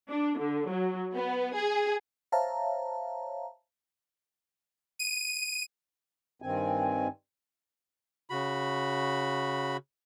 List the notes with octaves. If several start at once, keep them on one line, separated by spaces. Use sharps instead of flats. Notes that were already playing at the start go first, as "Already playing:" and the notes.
D4
D3
F#3
B3
G#4
C5 C#5 E5 F5 A5 A#5
D#7
G2 D#3 C4 G#5
C#3 F#4 B5